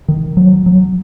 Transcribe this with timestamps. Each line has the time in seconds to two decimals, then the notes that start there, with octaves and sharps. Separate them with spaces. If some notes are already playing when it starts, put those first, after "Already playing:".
0.08 D#3
0.37 F#3
0.66 F#3